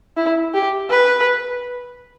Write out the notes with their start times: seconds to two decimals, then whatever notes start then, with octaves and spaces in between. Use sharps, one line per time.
0.16 E4
0.54 G4
0.90 B4